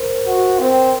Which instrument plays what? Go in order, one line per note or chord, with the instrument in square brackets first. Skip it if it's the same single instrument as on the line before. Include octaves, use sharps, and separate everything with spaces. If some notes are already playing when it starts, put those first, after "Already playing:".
Already playing: [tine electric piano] A#4 C5
[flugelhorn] F#4
C4